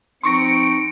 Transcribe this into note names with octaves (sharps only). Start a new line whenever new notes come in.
F3 C4 D#4 C6 C#6 A#6 C#7 D7